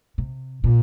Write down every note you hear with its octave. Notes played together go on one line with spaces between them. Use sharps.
C3
A#2